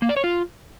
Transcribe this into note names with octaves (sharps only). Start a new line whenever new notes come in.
A#3
D5
C#5
F4